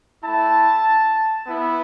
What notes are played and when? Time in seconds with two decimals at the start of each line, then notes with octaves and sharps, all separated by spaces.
0.24 A3 E4 A5
1.45 B3 E4